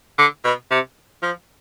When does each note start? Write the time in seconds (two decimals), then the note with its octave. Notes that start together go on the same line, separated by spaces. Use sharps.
0.18 D3
0.44 B2
0.71 C3
1.22 F3